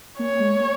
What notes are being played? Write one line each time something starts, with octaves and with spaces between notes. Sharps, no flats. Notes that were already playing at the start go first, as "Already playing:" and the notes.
A#3 C#5
G#3
A#3